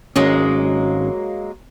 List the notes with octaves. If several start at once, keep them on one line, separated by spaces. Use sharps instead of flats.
G#1 F#3 G#3 A#3 C#4